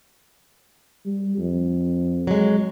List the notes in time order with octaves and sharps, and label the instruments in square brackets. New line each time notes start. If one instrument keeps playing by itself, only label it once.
[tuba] G3
F2
[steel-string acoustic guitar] F#3 G#3